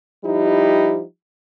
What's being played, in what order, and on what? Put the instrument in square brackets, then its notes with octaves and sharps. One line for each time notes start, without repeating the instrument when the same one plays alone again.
[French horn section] F3 G3 D#4 E4 G4